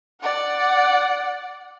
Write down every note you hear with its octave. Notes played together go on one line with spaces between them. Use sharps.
D5 F#5